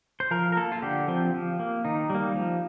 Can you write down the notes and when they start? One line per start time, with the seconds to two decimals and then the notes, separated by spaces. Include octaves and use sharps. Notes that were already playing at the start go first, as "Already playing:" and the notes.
0.20 C5
0.31 F3 A#4
0.52 A#4
0.57 A#3 A4
0.72 F4
0.82 D3 G4
1.08 F3 C4
1.34 F3
1.59 A#3
1.85 D#3 D#4
2.10 G3 A#3
2.36 F3